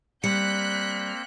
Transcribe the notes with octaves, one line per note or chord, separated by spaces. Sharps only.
G3 A#3 C4 F#6 G6 B6 C#7